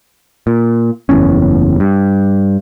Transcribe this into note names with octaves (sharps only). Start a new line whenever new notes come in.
A#2
F#1 E2 A2 C#4
G2